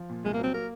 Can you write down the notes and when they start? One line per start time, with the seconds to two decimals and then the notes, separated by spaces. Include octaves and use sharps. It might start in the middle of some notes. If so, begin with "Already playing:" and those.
Already playing: F3
0.10 A#2
0.24 C2 G#3
0.34 A#3
0.39 F#3 C4
0.54 A#3 A#4